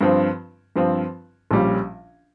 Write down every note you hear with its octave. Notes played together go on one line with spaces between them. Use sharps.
G2 F3 C4
G2 F3 C4
A#1 A#2 G3 C#4